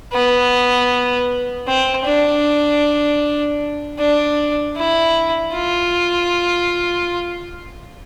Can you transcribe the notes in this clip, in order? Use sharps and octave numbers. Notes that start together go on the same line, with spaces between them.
B3
C4
D4
D4
E4
F4